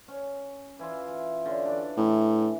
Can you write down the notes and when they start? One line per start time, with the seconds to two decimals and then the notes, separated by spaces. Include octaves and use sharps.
0.08 C#4
0.79 E3 E4 F4
1.46 D3 C#4
1.65 E3 D4
1.97 A2 E3